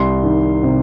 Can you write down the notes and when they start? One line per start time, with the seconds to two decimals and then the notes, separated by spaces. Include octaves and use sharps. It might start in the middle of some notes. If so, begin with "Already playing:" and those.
Already playing: C2 C6
0.23 D#3
0.63 C3